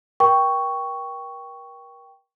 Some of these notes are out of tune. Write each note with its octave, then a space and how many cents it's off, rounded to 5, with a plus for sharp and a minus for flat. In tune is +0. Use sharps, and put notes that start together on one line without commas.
A#4 +35 G5 +0 C#6 +5